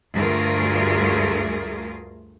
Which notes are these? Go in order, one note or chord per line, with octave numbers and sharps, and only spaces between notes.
D2 G2 A3 F4 G#4 A#4